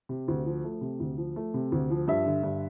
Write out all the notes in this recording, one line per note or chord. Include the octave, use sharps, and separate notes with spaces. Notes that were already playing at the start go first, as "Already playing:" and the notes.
C3
D2
F3
A3
C3
D2
F3
A3
C3
D2
F3
G2 E5
D3
G2